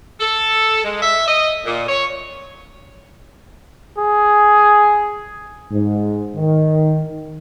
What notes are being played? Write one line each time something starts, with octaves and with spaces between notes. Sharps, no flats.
A4
G#3
E5
D#5
A#2
C#5
G#4
G#2
D#3